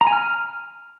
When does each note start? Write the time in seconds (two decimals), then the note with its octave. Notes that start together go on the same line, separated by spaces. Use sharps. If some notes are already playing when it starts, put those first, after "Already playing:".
0.01 A#5
0.07 G#5
0.13 F6